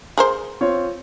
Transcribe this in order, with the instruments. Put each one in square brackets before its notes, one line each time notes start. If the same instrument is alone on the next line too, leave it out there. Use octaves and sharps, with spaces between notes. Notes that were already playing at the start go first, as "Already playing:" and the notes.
[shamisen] G#4 A#4 C5
[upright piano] C4 F4 C#5